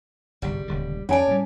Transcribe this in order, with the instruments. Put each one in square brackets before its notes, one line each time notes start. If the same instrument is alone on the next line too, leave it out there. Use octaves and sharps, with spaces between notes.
[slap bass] G1 C2 G#2 [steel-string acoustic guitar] G3
[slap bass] D#1 C#2 D3
[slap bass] F2 [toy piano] C#4 G#5 A5 [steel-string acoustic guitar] C#5 D5
[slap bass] A2 G3